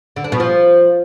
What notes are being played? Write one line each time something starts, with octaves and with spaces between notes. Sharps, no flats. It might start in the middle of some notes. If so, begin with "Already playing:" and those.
D3
D4
B2
F3